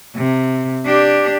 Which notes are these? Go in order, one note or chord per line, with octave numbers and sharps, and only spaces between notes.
C3
D4 G4